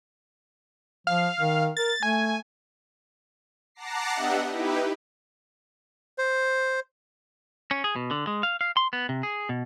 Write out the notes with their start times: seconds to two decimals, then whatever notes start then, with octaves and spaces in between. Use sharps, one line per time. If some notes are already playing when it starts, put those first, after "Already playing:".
1.07 F3 F5
1.40 D#3
1.77 A#4 A6
2.03 A3 G#5
3.75 F#5 A5 A#5 D6 A#6 C7
4.13 B3 D4 G4 D#5 E5 F#5
4.49 D#4 E4 G4 B4
6.18 C5
7.71 C#4
7.84 G#4
7.96 B2
8.11 D3
8.27 G#3
8.43 F5
8.61 F5
8.77 C6
8.93 B3
9.09 C3
9.23 G#4
9.49 B2